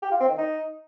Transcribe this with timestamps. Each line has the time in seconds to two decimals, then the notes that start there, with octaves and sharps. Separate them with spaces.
0.03 G4
0.11 F4
0.20 C4
0.29 D#3
0.38 D#4